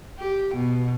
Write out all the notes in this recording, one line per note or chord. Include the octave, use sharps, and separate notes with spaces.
G4
B2